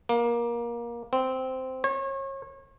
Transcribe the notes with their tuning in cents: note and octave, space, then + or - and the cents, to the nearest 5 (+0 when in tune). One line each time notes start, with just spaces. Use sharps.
A#3 +20
C4 -10
C#5 -35